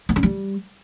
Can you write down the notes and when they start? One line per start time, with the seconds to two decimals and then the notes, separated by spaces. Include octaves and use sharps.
0.09 B3
0.16 C#4
0.23 G3